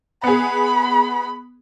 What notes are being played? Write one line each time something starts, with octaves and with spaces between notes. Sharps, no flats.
B3 G#4 B5